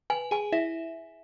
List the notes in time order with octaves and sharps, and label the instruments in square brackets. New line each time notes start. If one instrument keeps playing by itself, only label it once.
[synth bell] B4 [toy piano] G#5
[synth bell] G#4 [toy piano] G#5
[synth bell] E4 [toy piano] E5